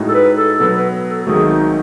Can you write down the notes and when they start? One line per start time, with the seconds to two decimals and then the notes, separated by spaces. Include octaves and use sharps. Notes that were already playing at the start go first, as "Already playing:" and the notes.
Already playing: A2 G#3 D#4 F#4
0.09 A4
0.14 B4
0.37 A4
0.60 B2 F#3 B3 A4
0.76 B4
1.09 A4
1.26 G#1 G#2 D#3 F#3 A3 G#4
1.49 D#4